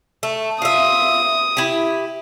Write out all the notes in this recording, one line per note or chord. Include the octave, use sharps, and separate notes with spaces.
A3
F4 E5 D#6
E4 G4